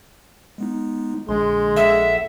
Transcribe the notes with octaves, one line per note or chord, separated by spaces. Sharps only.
G#3 B3 D#4
A#1 D3 G#3 C6
A4 E5 F#5